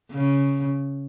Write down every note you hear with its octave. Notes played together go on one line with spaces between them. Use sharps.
C#3